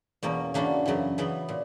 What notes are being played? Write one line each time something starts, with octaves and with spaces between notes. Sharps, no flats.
E2 B2 A#3 C#4
C#3 E3 A#3 D4 F#4
F#2 C#3 E3
C#3 E3 B3
A#2